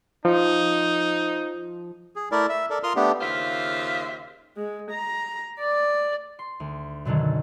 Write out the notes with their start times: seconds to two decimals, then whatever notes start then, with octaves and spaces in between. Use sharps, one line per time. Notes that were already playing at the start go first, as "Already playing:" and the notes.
0.25 F3 D#4
2.16 G#4
2.32 A3 E4 A#4 D5
2.49 E5
2.70 A4 A#4 D5
2.83 F4 A#4 C6 D#6 F6
2.96 A3 B3 D4 G4
3.21 D#2 C#3 F4 C5 E5
4.57 G#3
4.91 A#5
5.60 D5
6.39 C6
6.60 D2
7.05 F#2 B2 D3 D#3 F#3